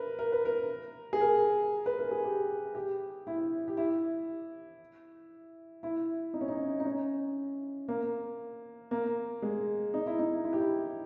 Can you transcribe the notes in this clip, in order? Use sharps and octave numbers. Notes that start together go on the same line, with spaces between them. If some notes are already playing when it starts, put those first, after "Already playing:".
Already playing: A#4 B4
A#4
B4
A#4
G#4
A#4
B4
A#4
G#4
G4
G4
E4
G4
E4
E4
D#4
C#4
D#4
D#4
C#4
A#3
A#3
G#3
D#4
E4
D#4
E4
G4
E4